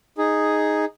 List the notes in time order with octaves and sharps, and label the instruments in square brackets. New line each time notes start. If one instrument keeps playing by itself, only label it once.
[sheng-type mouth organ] D#4 G#4